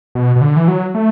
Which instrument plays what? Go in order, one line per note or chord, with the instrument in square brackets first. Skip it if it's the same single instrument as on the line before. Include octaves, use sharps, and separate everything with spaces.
[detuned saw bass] B2
B2
D3
E3
F#3
A3